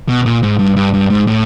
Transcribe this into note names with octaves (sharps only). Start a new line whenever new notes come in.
B2
A#2
G#2
G2
G2
G2
G#2
A2